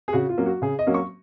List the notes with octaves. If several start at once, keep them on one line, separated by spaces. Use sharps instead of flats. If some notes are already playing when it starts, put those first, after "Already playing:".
G#4
C#3 F#4
F4
F#3 A#3 C#4
F#4
C#3 G#4
D#5
F#3 A#3 C#4
C#6